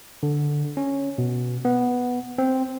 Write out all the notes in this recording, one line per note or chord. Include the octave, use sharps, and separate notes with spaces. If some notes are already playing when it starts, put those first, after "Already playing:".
D3
C#4
B2
B3
C4